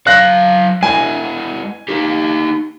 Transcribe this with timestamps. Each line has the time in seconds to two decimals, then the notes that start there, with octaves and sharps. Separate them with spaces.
0.07 F#3 F5 F#6 A#6
0.83 G#3 E4 G#5
1.88 D#4 G4